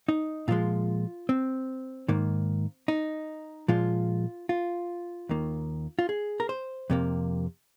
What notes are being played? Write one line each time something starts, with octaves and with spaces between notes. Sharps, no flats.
D#4
A#2 F3 G#3 F4
C4
G#2 D#3 A#3
D#4
A#2 F3 G#3 F4
F4
D#2 D#3 A#3
F4
G#4
A#4
C5
F2 C3 A#3